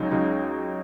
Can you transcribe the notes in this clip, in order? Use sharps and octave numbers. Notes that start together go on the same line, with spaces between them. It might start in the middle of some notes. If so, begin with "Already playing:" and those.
Already playing: C#2 C#3 F#3 D#4
C#2 C#3 F#3 D#4